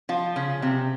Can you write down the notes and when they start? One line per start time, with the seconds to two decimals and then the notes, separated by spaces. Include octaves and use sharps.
0.09 F3 F4
0.36 C#3 C#4
0.62 C3 C4